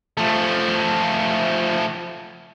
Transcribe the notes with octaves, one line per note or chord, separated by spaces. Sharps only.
F3 A3